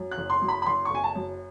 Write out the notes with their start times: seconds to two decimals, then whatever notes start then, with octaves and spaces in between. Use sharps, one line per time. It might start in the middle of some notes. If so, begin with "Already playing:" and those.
Already playing: F#2
0.11 F#6
0.18 F#1
0.30 C6
0.41 F#2
0.48 B5
0.62 B5
0.66 F#1 C6
0.85 C#6
0.90 F#1 G#5
1.04 A5
1.15 F#2